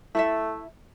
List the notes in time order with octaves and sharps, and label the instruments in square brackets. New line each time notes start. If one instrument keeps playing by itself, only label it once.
[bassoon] A3 [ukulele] E4 A4 E5